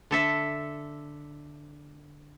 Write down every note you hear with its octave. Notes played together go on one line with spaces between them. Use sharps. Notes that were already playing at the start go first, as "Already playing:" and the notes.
D3 A4 E5